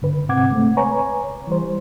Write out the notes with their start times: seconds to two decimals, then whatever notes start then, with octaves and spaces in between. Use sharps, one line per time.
0.02 G2 D3 B4
0.29 G#2 C3 C4 F#5 D6 G#6
0.51 G#3 A3 C4
0.77 B4 C#5 G#5 A#5 C#6
1.47 E3 G3 C5